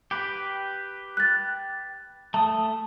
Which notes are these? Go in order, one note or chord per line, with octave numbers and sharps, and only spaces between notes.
G4 B4
F#6 A6
A3 A5 D#6